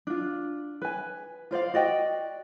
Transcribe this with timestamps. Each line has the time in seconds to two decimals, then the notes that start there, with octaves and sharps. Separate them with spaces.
0.07 D4 F4
0.82 B4 G#5
1.51 F4 C5 D5 F5
1.74 F#4 D5 D#5 G5